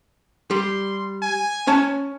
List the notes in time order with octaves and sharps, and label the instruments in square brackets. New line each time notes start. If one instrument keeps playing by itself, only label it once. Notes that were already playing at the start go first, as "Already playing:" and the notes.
[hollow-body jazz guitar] G3 [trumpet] C6
[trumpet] G#5
[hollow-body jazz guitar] C#4 C#5 A5